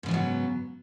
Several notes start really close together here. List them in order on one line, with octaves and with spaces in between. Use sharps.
G#2 C#3 F3 B3 F#3